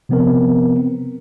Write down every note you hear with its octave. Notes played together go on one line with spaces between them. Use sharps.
C3 F3 B3 C4 A#4